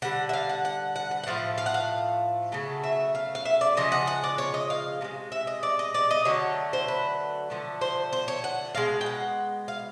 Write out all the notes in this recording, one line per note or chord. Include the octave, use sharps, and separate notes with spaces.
D3 G3 F#5
E5
F5
F#5
F#5
F#5
F#5
F#5
A2 F3 A3 F5
F5
F#5
F5
C#3 F#3 A3
E5
F5
F5
E5
D5
C#3 F3 G#3 D#5
F#5
F#5
D5
C#5
D#5
F5
C3 F3 G#3
E5
D#5
D5
D#5
D5
D#5
D3 F#3 A3 C#5
C5
B4
D3 F3 A3
C5
C5
C#5
F#5
B2 G#3 F5
G5
F#5
F5